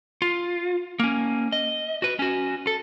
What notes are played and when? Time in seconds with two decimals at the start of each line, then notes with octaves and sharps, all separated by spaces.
0.22 F4
1.00 A#3 C#4
1.52 D#5
2.02 F#4 B4
2.19 C#4 F#4
2.67 A4